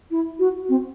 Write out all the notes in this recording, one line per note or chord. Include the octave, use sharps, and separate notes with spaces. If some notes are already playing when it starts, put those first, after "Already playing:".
E4
F#4
C4